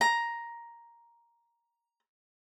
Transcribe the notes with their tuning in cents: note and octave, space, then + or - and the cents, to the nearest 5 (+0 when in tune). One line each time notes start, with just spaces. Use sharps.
A#5 +5